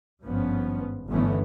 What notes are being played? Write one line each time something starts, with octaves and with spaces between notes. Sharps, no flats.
G#1 G2 F3 B3 C#4
G1 E3 A3 B3 C#4